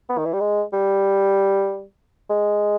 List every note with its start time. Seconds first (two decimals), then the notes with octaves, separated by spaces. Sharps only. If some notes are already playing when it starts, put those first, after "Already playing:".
0.09 B3
0.18 D#3
0.25 E3
0.33 G3
0.40 G#3
0.73 G3
2.30 G#3